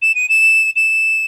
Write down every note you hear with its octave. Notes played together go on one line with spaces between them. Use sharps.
E7
D#7
E7
E7